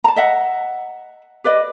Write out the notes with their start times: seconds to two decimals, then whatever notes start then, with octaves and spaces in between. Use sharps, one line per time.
0.04 A5 A#5
0.16 D#5 E5 F#5
1.44 G4 B4 D5 D#5